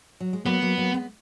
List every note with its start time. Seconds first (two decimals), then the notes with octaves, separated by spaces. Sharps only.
0.20 F#3
0.33 G#3
0.46 F#3 A#3 B3
0.62 F#3 A#3
0.78 F#3 A#3
0.94 G#3 B3